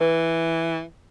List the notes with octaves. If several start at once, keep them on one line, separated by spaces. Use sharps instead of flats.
E3 B4